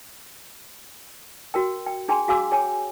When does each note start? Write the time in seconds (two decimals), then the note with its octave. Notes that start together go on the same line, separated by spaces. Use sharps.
1.54 F#4 A#4 G5
1.87 G5
2.08 D4 G#4 G5 G#5 C6
2.28 F#4 G#4 F5 G#5 D6 E6
2.51 G#4 C#5 G5 G#5